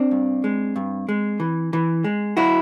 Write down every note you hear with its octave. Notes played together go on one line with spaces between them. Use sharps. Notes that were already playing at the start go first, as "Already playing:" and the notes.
Already playing: C4 D4
G2
G#3
G2
G#3
E3
E3
G#3
F#3 E4 F#4